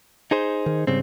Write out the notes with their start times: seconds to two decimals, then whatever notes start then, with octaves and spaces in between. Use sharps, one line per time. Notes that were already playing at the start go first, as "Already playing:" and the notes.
0.31 D#4 G#4 C5
0.66 D#3
0.87 G#2 C#3 G3 C4